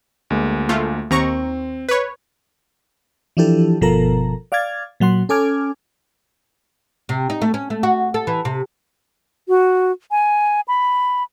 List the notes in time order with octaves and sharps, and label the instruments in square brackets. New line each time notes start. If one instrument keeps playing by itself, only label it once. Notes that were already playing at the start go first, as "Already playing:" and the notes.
[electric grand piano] D2 G#3 A#3
[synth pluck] A3 F4
[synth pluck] D#2 A#5 C#6 [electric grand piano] C4
[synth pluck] B4 C#5
[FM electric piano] E3 F3 D4 E4 G4 A4
G1 B2 F3 A4 A#4 A#5
D5 F5 D6 F6 G#6 A6
A#2 F#3 F#5 C6
C#4 A4 G#5 D6 F6 G#6
[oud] C3
D#4
A3
C#4
A3
F#4
A4
E3
C3
[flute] F#4
G#5
B5